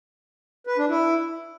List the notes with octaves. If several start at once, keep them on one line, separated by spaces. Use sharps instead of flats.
B4
D4
E4